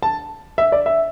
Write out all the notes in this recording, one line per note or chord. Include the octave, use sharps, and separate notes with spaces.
A5
E5
D5
E5